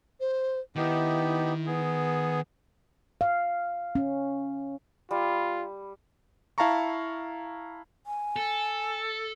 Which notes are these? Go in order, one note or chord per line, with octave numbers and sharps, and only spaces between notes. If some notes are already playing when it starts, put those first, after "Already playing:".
C5
D#3 B3 D#4 E4 G4
B3 G#4
F5
C#4
G3 F4
E4 F5 A5 A#5 C#6
G#5
A4